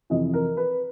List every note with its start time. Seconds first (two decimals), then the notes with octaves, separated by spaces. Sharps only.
0.10 F2 C3 E3 D#5
0.34 A#4
0.57 B4